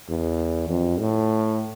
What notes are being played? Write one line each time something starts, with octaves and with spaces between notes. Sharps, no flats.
E2
F2
A2